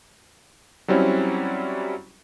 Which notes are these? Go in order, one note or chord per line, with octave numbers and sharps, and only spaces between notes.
F#3 G3 C4 C#4 E4